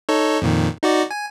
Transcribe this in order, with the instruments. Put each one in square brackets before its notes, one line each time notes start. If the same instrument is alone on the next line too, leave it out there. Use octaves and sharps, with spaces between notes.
[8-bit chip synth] D#4 A4 C#5
F2 A#2 D#3
D#4 F#4 D5
G#5